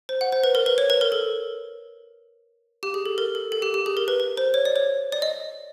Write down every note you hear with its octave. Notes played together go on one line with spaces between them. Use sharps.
C5
F#5
C5
B4
A#4
B4
C#5
B4
A#4
A4
G4
G#4
A4
A#4
A4
A4
G4
G4
G#4
A#4
B4
B4
C5
C#5
D5
C#5
D5
D#5